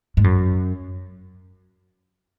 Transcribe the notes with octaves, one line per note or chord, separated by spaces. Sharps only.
G#2
F#2